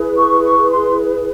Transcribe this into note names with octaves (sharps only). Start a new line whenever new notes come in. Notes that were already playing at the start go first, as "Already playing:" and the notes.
Already playing: E4 G#4 B4
C#6
C#6
C6